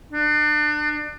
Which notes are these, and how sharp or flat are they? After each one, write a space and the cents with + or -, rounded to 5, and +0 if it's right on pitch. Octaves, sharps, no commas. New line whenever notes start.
D4 +35